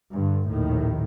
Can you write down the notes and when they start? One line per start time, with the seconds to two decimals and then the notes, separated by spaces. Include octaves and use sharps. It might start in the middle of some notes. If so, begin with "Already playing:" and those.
0.13 G2 D3
0.47 A#1 D#2 A2 D#3